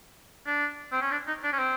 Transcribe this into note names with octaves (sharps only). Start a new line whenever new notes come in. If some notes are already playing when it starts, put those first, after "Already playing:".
D4
C4
C#4
D4
D#4
D4
C#4
C4